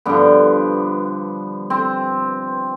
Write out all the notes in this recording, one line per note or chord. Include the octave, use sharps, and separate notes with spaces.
G2 D3 F3 B3
C4